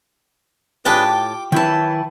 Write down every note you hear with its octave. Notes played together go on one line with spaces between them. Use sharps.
A2 D4 F4 G4 G#4 B4 G5 A5
D6
D#3 E4 B4 C#5 G5 A5